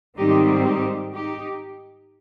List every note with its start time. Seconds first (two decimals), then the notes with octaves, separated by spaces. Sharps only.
0.18 G#2 D#3 G3 C4 D#4 G4
0.65 D#4 G4
1.13 D#4 G4